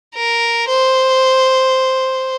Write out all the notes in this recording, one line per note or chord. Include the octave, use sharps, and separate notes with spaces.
A#4
C5